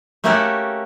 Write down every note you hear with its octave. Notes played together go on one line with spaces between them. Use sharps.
A3 A#3 C#4 F#4 G4 A4